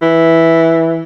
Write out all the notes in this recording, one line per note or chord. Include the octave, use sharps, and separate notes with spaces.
E3